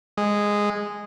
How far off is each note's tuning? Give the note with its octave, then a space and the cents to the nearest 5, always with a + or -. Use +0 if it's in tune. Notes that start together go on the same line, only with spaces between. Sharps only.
G#3 -10